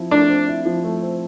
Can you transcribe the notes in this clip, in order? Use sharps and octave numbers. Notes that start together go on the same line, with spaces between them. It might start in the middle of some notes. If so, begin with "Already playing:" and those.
Already playing: F3 C4 E4
A3 D4
C4
E4
F3
A3
C4